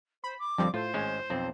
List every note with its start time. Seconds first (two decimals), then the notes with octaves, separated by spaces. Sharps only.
0.24 C5 B5
0.39 D6
0.58 F2 D3 F3 G3 C4
0.74 A2 F4 C5
0.94 G#1 G#3 C#4
1.30 B1 F2 C4